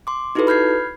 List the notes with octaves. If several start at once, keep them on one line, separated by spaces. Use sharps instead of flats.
C6 D6
D#4 E4 F#4 G4 A4 B4
B5 F6 G6 G#6 C7